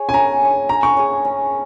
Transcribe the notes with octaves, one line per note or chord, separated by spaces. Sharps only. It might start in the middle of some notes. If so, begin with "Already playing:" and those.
Already playing: G#4 C#5
G#5
C#4 A#5
G#4 C#5
C#4 A#5
C#6
G#4 C#5
C#4